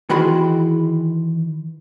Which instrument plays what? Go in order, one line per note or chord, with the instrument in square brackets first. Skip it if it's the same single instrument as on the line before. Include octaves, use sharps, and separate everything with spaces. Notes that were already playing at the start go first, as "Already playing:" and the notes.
[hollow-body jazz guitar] D#3 E3 F#4 G#4 B5 C6